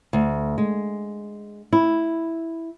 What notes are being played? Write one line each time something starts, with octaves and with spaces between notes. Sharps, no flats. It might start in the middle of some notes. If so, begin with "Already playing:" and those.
D2
G#3
E4